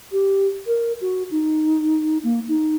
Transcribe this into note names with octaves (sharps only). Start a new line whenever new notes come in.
G4
A#4
F#4
D#4
A#3
D#4